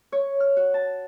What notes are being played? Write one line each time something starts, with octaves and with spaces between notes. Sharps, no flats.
C#5
F6
F#4
A5